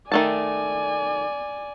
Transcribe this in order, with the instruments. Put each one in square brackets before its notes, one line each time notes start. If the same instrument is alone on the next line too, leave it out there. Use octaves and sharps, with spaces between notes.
[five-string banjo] D#3 A3 A5 [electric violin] D5 G#5